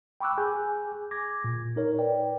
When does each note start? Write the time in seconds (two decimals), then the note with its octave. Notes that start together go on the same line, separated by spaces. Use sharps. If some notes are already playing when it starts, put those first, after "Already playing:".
0.20 G5 B5 C#6 D6 E6 F#6
0.38 G#4 G#5 G6
1.11 D6 G#6 A#6
1.44 A#2
1.76 D#4 A#4 C#5
1.98 B4 D5 G5